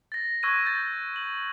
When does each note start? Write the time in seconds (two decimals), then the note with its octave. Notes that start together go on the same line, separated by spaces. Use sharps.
0.12 A6 A#6
0.43 C#6 E6 F#6 G#6 A#6 D#7
0.65 G6 A6
1.16 F#7